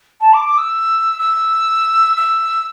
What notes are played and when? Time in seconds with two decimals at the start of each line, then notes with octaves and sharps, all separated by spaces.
0.21 A5
0.33 D6
0.45 D6
0.58 E6
1.19 E6
2.17 E6